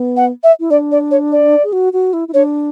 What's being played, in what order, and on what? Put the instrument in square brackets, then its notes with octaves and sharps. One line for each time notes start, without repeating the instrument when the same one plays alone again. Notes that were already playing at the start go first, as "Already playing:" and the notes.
Already playing: [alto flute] B3
[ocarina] F#5
E5
[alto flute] E4
[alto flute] D4 [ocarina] D5
[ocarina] D5
C#5
D5
[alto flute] G#4
F#4
F#4
E4
E4
[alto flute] D4 [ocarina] C#5